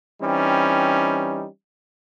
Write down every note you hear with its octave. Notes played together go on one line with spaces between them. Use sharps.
E3 G3 C4 C#4 D#4